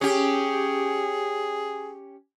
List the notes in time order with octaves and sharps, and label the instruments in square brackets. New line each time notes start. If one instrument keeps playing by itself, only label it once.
[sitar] C#4 G4 [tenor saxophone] G#4